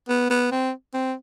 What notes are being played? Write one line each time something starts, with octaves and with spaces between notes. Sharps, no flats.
B3
B3
C4
C4